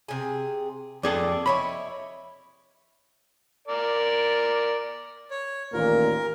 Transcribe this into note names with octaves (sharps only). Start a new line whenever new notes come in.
C3 G#4
F2 G#4 A4 D5
E4 C#5 D#5 B5
A#4 D5
C#5
A1 D#2 A#2 A#4